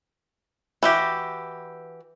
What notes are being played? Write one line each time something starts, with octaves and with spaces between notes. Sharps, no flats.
E3 F#4 G4